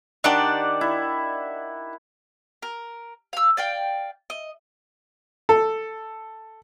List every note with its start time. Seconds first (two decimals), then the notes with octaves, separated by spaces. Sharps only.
0.24 D#3 D4 G4 D5 F#5 A5
0.81 E4
2.62 A#4
3.33 F5 E6
3.57 D5 F5 G5
4.30 D#5
5.49 A4